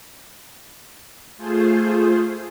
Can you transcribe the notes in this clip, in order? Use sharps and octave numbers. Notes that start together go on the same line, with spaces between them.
A3 F4 G#4 C5